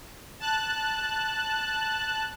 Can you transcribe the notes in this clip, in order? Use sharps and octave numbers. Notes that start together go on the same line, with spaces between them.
A5 F#6